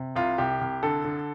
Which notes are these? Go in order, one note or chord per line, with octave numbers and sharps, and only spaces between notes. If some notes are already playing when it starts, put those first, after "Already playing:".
Already playing: C3
C2 F4
C2 G4
C2
D3 A4
D3